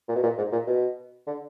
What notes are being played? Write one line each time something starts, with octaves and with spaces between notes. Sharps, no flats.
A#2
B2
A#2
G#2
A#2
B2
D3